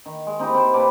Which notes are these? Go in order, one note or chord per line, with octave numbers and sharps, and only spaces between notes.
D#3
G#3
C4 D#4 E4 G4
C4 A#4 C5
A#2 B4 A5 D6